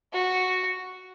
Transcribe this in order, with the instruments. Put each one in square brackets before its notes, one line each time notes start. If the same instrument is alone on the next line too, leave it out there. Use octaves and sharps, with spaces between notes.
[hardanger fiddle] F#4